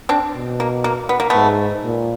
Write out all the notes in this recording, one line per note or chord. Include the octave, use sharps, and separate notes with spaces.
C4 D4
B2
A#3
A#3
B3
A#3
G#2 A3 B3
A#2